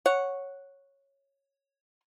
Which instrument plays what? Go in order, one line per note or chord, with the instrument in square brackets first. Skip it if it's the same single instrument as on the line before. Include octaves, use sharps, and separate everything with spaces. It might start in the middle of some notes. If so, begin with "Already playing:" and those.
[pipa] C#5 F#5